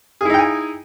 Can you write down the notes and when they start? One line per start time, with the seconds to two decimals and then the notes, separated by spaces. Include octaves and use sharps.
0.21 G#4
0.25 E4
0.30 D#4
0.34 G5
0.39 G#5